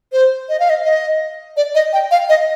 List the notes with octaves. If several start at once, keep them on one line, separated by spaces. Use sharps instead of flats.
C5
D#5
F5
D#5
D#5
D5
D#5
G5
F5
D#5